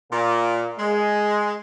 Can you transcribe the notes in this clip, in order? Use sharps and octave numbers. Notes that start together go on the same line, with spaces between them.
A#2
G#3